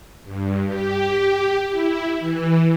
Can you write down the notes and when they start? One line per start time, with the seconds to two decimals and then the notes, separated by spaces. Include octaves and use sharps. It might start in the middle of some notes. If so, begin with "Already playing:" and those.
0.25 G2
0.66 G4
1.70 E4
2.20 E3